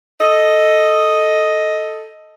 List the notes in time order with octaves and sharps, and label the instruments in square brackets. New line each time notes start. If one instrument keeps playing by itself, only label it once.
[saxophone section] A4 D#5